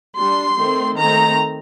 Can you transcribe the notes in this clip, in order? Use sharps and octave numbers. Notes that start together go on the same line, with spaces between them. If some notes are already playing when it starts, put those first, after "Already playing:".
G3 D4 C6
D#3 A3 C4
D#3 A3 C4 A#5